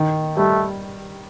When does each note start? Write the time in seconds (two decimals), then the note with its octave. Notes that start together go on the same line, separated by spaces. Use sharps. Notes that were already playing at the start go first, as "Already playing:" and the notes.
Already playing: D#3
0.37 G3 A3